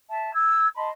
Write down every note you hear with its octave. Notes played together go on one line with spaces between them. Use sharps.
E5 A5
E6 G#6
D#5 A5 B5 C6